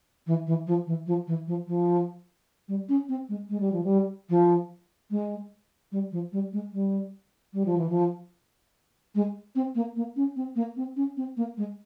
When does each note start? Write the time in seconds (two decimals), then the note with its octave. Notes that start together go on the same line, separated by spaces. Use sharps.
0.27 E3
0.47 E3
0.67 F3
0.87 E3
1.07 F3
1.27 E3
1.47 F3
1.67 F3
2.68 G3
2.89 C#4
3.09 C4
3.29 G#3
3.50 G#3
3.60 G3
3.72 F3
3.84 G3
4.30 F3
5.11 G#3
5.92 G3
6.12 F3
6.33 G3
6.53 G#3
6.73 G3
7.54 G3
7.66 F3
7.78 E3
7.90 F3
9.15 G#3
9.55 C4
9.75 A#3
9.96 A#3
10.16 C#4
10.36 C4
10.56 A#3
10.77 C4
10.96 C#4
11.17 C4
11.37 A#3
11.57 G#3